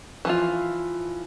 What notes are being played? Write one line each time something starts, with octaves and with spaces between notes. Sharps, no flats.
E3 F3 F4